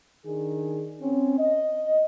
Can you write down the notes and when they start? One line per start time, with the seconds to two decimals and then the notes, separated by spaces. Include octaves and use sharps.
0.24 D#3 D4 G#4
1.00 C4 C#4
1.37 D#5